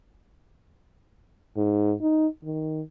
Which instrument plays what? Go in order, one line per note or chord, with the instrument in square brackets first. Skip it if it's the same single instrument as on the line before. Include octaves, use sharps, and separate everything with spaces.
[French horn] G#2
D#4
D#3